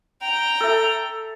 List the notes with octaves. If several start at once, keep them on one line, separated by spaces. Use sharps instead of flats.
G5 A#5
A4 E5